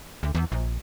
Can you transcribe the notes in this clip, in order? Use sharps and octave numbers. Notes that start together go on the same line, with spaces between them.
D2
E2
A#1